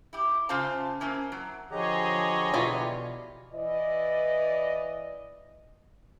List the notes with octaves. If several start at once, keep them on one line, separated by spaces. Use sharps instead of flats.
E4 G4
C#3 C#4 F4 C5 F5 A5
A#3 C4 C#4 E4
F#3
D3 F3 G4 G#4 C#5 D#5 A#5
B2 E3 F4 D5
E3 D5 D#5